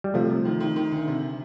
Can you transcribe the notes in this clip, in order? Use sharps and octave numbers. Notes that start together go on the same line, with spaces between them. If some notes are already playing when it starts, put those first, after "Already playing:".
G3
C3 F3 A3
C3
D#3
D#3
D#3
D2
C3